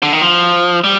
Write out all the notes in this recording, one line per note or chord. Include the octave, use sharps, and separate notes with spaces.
D3
D#3
F3
G3